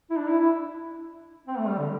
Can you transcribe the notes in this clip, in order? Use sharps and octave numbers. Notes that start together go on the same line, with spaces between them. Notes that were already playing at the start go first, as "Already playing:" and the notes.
E4
D4
E4
E4
C4
A3
G3
D3